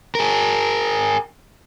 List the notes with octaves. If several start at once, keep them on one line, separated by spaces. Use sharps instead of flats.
G#4 A#4